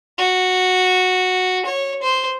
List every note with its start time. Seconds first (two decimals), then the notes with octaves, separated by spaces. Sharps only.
0.19 F#4
1.65 C#5
2.03 C5